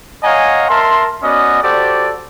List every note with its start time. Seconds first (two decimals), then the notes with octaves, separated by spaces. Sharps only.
0.24 C#5 D#5 F5 F#5 G#5 A#5
0.69 A#4 E5 A5 C6
1.23 B3 C#4 F#4 D5 D#5
1.63 F#4 G4 A4 C5 D5